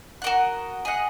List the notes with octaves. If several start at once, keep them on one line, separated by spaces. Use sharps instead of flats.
F#4 A#4 D#5 F#5
G#4 D#5 F#5